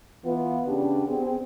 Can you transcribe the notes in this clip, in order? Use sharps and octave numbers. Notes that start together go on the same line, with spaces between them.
E3 B3 F4
C#3 D4 G4
B3 C4 G#4